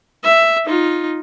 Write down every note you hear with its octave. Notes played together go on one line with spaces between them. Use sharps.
E5
D#4 F4